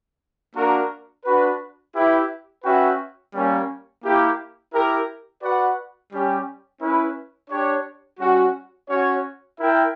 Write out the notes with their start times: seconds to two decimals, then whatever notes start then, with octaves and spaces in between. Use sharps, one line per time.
0.55 A#3 D4 F#4 A#4
1.25 D4 F#4 B4
1.94 E4 G4 B4 E5
2.64 C#4 F#4 B4 E5 G5
3.33 G3 A#3 C#4
4.03 A#3 E4 G4
4.73 E4 G4 A#4
5.42 F#4 B4 D5 F#5
6.11 G3 C#4 G4
6.81 C#4 E4 B4
7.50 D4 G4 C#5
8.19 G3 C#4 F#4
8.89 C#4 F#4 C#5
9.59 E4 A#4 E5 G5